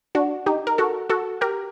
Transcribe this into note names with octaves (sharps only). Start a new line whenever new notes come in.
D4 F#4
D#4 G4
A#4
F#4 A4
F#4 A4
G4 A#4